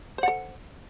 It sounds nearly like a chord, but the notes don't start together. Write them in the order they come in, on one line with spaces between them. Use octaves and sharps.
C5 F#5 A4